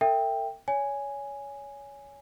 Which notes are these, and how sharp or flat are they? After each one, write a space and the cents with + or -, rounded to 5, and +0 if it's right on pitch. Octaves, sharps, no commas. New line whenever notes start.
A4 +45 E5 +0 G5 +10
C#5 +25 G#5 +0